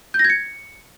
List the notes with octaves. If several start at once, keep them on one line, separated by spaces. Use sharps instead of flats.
G6
A#6
G#6
C#7